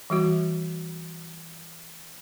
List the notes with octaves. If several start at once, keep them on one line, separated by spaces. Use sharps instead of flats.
E3 G3 F#4